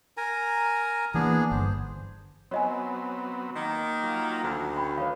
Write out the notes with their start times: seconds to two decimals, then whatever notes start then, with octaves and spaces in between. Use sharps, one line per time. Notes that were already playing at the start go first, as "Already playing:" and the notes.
0.17 A#4 G#5 A#5
1.14 E3 A#3 B3 D4 G#4
1.52 G1 C5
2.51 F#3 B3 C4 C#5 D#5 G#5
3.56 D#3 A#3
4.03 F#3 F4 A#5
4.43 D2
4.76 C#4 G5 B5
4.98 D#3 B4 C#5 F5